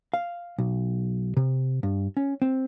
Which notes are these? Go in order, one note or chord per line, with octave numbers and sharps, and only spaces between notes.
F5
B1
C3
G2
C#4
C4